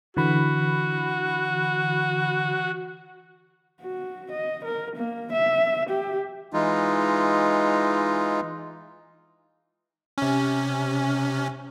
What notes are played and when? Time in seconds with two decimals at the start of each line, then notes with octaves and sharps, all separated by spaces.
0.17 D3 E3 F#4 B5
3.81 F#4
4.31 D#5
4.65 A#4
4.96 A#3
5.33 E5
5.89 G4
6.53 E3 G#3 D#4 F4
10.18 C3 C#4